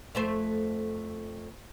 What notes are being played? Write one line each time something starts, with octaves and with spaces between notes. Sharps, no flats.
F2 A3 C5